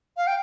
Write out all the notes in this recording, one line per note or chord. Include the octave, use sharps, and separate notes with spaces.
F5
G5